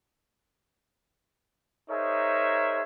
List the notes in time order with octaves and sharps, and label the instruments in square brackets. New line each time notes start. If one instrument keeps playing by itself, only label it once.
[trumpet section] D#4 G#4 A#4 C5 C#5 E5